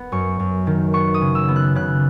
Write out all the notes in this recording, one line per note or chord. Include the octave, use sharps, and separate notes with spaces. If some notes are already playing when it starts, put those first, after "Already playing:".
Already playing: B3
F#2 C#6
F#2
D#3
B3 C#6
D#6
C#3
E6
B3
F#6
C#3 F#6